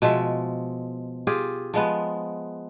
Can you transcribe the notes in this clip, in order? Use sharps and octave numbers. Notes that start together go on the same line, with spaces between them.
B2 F3 G#3 E5
F4 G4 G#4
F3 G#3 B3